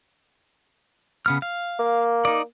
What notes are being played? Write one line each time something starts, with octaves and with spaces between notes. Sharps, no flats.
C#3 B3 F6
F5
A#3
D#4 D5